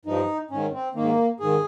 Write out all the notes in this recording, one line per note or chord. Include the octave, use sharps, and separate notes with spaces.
G2 F3 D#4
G#2 D#3 C#4
C4
G#2 D#3 A#3
G#2 D#3 G#4